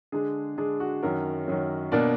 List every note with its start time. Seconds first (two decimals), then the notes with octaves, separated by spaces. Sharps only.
0.12 D3 G#3 D4 G#4
0.57 D3 G#3 D4 G#4
0.80 F#4
1.02 F#2 D#3 F#3 F#4 A#4
1.47 F#2 D#3 F#3
1.92 B2 A#3 D4 A#4 D5